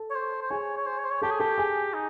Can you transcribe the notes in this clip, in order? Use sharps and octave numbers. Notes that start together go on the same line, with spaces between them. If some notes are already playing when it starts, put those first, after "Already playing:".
Already playing: A4 A5
C#5
C5
C5
G#4 C#5 G#5
C#5
C5
C#5
C5
C#5
G4 A4 A5
G#4
G4 A4 A5
G#4 G#5
D#4